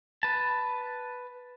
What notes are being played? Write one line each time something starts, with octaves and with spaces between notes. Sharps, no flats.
B4 A5